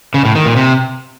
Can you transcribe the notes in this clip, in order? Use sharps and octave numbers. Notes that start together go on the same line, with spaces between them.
C#3
A2
D#3
A#2
C3